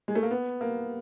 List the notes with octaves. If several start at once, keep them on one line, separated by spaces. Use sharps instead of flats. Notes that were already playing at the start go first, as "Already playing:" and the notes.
G#3
A3
A#3
B3
A#3